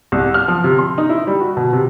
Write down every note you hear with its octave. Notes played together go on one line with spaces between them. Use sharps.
C2
F6
F3
C3
C6
D#4
E4
G3
F#4
B2
C3